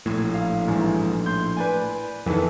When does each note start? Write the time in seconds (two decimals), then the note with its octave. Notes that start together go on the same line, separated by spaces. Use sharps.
0.06 A#1 A2
0.34 F5
0.68 A1 G#2
1.26 C6 G6
1.57 B4 D5 G#5
2.26 F2 D#3 E3 B3 A4